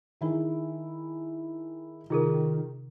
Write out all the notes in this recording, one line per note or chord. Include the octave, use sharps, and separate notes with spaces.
D#3 E4 G#4
C3 D#3 F4 G#4 A#4